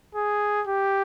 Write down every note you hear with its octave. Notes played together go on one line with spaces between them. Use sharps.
G#4
G4